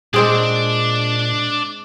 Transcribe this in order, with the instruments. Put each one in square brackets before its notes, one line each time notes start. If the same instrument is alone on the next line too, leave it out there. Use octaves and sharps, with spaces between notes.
[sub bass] A#2 [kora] G#3 C4 G#4 [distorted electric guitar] D4 D5